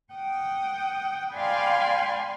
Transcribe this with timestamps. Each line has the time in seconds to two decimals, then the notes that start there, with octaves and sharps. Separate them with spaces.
0.14 F#5 G5 D#6
1.34 D5 F5 G5 G#5 B5 C6